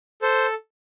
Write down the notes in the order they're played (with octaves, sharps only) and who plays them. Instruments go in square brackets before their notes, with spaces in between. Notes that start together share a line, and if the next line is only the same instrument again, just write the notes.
[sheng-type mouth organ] A4 C5